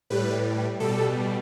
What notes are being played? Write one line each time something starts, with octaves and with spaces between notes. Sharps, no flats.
A2 G3 B4
B2 G3 A4